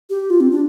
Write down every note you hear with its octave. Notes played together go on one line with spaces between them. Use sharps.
G4
F4
C4
D4